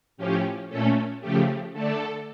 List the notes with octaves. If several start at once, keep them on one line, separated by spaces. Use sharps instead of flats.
A2 F3 C#4 G4
A#2 A3 C#4 A4
C#3 F3 A3 G4
D3 A3 D4 A4